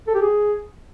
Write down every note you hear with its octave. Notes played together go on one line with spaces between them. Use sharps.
A4
G4
G#4